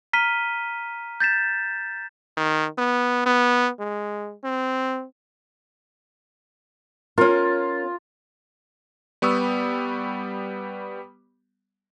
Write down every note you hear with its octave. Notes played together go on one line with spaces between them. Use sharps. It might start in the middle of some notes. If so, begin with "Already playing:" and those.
A#5 F6 B6 D#7 G7
G6 A6 B6 E7
D#3
B3
B3
G#3
C4
C#4 F4 A#4
G3 B3 C#6 D#6 E6